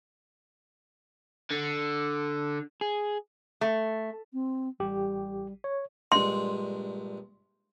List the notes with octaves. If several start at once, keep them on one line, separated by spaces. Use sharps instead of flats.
D3
G#4
A3
C4
A1 G3 G4
C#5
A#1 G2 G#3 C6